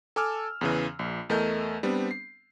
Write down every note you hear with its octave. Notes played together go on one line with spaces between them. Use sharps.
A4 G#5 A5 D6 E6 F6
E2 C#3 E3
A#1
E2 A3 A4 A#4 D#5 G6
G3 B3 C4 D4
C7